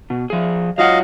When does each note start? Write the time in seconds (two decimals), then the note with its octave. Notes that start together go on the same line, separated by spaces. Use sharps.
0.10 B2
0.30 F3 G#4
0.78 F#3 F4 D#5 F5 F#5